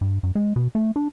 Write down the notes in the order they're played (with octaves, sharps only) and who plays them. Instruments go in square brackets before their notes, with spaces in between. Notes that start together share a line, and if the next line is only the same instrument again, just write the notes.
[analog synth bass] G2
F#2
G#3
B2
A3
D4